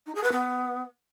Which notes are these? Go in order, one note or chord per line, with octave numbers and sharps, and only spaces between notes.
D#4
G#4
B4
B3